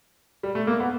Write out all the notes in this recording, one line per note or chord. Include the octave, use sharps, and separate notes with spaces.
G3
A3
A#3
B3